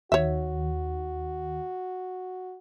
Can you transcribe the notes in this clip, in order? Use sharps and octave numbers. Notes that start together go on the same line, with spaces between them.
D#2 D#3 F#4 C#5 E5